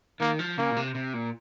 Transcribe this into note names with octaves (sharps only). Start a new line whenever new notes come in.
D#3 A#3
F3
C#3 A#3
A#2
C3
C3
A#2